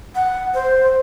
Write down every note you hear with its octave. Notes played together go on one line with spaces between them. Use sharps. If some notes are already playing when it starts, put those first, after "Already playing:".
F#5
C5